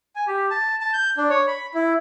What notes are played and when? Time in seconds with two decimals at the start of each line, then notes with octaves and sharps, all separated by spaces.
0.16 G#5
0.27 G4
0.51 A5
0.81 A5
0.93 G6
1.17 D4
1.30 C#5
1.48 B5
1.74 E4